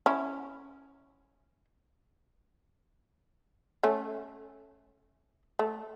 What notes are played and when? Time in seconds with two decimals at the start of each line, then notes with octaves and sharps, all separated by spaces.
0.06 C#4 E4
3.83 A3 C#4
5.59 A3